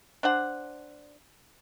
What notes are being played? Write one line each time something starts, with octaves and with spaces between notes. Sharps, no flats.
D4 C5 F#5